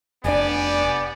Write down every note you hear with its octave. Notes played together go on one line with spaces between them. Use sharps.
F1 B3 D4 G4 D5 G#5